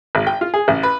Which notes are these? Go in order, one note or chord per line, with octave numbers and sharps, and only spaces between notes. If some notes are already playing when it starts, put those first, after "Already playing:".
G#1
G5
F4
G#4
A1
B4